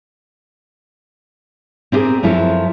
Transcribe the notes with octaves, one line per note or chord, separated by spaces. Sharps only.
C4 E4 G4 G#4 A#4
F#2 F3 E4 F4 A4 A#4